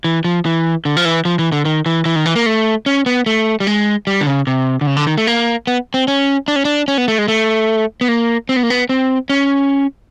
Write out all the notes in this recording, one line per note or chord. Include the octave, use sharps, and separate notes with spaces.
E3
F3
E3
D3
F3
E3
F3
E3
D3
D#3
E3
E3
D#3
E3
A#3
A3
C#4
B3
A3
G3
G#3
G3
D3
C#3
C3
D3
C#3
D3
D#3
A3
A#3
B3
C4
C#4
D4
C#4
D4
C#4
B3
A3
G#3
A3
B3
A#3
C4
B3
A#3
B3
C4
C#4